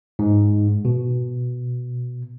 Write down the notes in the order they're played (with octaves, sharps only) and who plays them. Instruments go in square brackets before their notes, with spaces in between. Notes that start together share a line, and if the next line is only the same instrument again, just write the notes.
[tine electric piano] G#2
B2